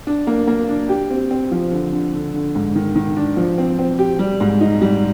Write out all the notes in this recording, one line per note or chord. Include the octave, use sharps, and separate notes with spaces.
D4
A#3
A#3
D4
G4
C4
C4
F3
D3
D3
D3
D3
G#2
D#3
D#3
D4
F3
C4
C4
G4
G3
G#2
D#4
G3